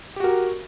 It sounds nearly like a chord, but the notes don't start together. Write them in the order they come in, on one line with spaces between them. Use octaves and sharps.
G4 F#4 A#4